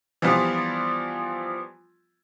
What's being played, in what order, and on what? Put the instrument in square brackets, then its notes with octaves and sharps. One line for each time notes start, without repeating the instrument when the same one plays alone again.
[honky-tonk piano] E3 F3 G3 B3 F4